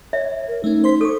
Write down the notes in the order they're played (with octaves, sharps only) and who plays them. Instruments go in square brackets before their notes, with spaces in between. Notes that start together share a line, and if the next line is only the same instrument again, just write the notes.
[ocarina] C#5 [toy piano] E5
[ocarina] A#4
[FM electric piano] A3 C#4 [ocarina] D#4
[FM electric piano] C5 C6 B6
[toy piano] A4 [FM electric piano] C#6 D6